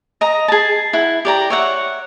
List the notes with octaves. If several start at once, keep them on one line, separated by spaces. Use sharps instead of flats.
D#5 A#5
G#4 A5
E4 F#5
G4 D5 A#5
C#5 E5 F#5